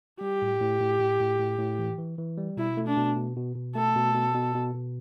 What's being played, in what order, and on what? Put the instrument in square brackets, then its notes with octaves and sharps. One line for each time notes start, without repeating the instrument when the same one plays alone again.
[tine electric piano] G3 [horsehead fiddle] G4
[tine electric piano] A2
A2
A2
A2
A2
A2
A2
E3
E3
E3
G3
[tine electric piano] B2 [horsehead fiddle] E4
[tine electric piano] A3
[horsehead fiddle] D4
[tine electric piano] B2
B2
B2
B2
[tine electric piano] A3 [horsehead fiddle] A4
[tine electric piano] B2
B2
B2
B2
B2